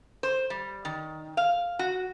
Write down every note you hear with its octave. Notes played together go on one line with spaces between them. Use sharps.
C5
G3
D#3
F5
F#4